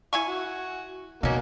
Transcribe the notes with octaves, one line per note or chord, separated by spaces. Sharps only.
E4 G#5 C#6
F#4
B2 A#3 C#4 D#4 F#4